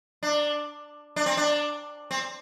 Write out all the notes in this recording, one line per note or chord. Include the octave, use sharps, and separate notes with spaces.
D4
D4
C4
D4
C4